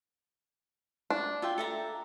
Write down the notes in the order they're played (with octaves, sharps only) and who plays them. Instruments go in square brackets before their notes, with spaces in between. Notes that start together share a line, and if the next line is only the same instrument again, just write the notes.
[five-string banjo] D4
[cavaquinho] F4 E5 G5
A4 E5 A#5